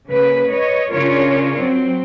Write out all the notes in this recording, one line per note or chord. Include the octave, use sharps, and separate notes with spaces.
C#3 A#3 B4
B4 C#5 D#5
C#3 C#4 D4 F4 A#4 C#5
F#3 C4